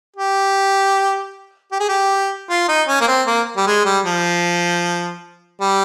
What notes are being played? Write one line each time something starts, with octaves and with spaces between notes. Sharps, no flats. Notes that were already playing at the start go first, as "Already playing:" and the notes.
G4
G4
G#4
G4
F4
D#4
C#4
A#3
C4
A#3
G3
G#3
G3
F3
G3